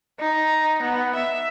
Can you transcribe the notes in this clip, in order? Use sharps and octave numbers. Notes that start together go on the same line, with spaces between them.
D#4
B3
E5